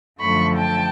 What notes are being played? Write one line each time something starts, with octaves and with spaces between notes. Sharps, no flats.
F#2 D3 F3 A3 B5 C#6
G5 A5